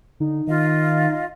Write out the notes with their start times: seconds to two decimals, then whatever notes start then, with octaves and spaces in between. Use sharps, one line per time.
0.20 D3 D#4
0.47 D#3 F4 D#5 F5